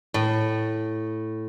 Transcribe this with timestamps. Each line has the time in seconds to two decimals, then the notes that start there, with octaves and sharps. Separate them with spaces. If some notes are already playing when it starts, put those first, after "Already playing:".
0.14 A2